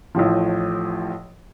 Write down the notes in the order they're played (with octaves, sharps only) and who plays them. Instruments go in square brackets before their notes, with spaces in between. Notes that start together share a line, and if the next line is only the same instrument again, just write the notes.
[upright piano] A1 A2 F3